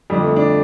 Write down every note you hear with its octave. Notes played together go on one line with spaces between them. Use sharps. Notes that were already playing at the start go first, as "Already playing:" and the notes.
F2 D3 F3 G3
A3
D4